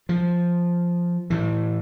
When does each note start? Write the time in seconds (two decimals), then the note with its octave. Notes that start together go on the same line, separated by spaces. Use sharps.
0.09 F3
1.30 A2 E3